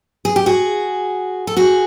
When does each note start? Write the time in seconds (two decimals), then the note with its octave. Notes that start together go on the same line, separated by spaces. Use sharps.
0.25 G#4
0.36 G4
0.46 F#4 G#4
1.47 A4
1.57 F#4 G#4